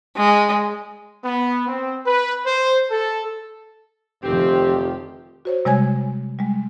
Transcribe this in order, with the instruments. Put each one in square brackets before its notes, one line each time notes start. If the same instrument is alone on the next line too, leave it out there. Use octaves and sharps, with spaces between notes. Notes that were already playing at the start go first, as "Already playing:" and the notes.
[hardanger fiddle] G#3
[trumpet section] B3
C4
B4
C5
A4
[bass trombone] F1 [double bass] D#3 F3 [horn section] C4 [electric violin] G4
[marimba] F#4 C5 C#5
C3 G3 G#3 C#5 G#5 G#6
G3 G#3